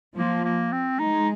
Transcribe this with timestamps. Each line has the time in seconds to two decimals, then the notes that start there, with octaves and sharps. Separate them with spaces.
0.16 F3 A#3
0.44 A#3
0.72 C4
0.99 G#3 D#4